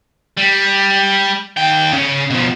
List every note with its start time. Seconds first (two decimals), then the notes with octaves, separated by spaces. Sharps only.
0.38 G3
1.57 D#2 G5
1.93 C#3 C#4
2.30 B2 F3